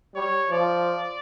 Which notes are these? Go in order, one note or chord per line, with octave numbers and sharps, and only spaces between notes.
G3 C#5
F3 D5